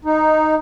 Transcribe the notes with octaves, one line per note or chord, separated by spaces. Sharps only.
D#4